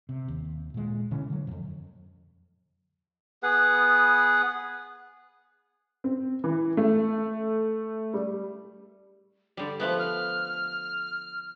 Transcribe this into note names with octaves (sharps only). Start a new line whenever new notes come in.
C3
D#2
A#2 G#3
B2 D3 E3 C#4
D3 F#3
F2 A2
B3 G#4 B4 F#5
C4
E3
A3
G3
D3 G3 D5
F3 A3 B3 F#6
F6